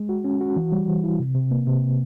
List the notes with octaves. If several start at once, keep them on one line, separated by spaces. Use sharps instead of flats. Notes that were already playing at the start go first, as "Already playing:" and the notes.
Already playing: G#3
F#4
C#4
F#4
E3
G3
E3
E4
C3
C3
A#3
C3